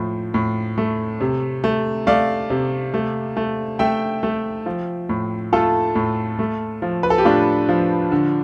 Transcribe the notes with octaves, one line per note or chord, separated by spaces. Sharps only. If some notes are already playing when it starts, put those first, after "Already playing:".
Already playing: A2 F3
A2
A3
C3
A3
A3 D5 F5
C3
A3
A3
A3 E5 G5
A3
F3
A2
A3 F4 A4
A2
A3
F3
B4
A4
G4
A2 D4 F4
F3
D3